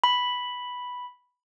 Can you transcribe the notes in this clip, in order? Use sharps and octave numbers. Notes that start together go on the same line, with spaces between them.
B5